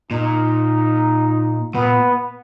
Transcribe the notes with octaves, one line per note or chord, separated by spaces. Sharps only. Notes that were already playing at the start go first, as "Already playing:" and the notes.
A#2 D#4
A#2 B3